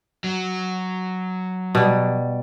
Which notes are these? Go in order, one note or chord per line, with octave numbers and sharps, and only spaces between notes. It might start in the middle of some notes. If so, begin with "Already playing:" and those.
F#3
B2 G3